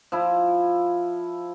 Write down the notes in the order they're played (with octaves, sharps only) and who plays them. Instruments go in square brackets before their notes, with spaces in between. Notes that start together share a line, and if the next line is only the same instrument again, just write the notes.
[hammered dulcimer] F3 E4